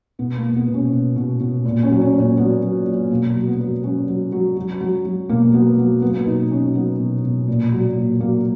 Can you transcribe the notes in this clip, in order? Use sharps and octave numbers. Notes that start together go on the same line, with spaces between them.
B2 B3
A#3
B2
B3
B2
C#4
B2
B2
B2
A#2
C#4
F#3
C#4
A#2
C#4
F#3 B3
F#3
F#3
B2 A#3
F#3
B3
F#3
F#3 C#4
F#3
F#3
F#3
F#3
F#3
B2 A#3
F#3 B3
F#3 B3
F#3 B3
A#3
B3
B2 D#4
B2 C#4
F#3 B3
B2
B2
A#2
F#3
A#2
F#3 A#3